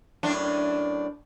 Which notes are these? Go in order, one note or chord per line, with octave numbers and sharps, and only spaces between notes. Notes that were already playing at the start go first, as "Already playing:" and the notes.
F#2 A2 D4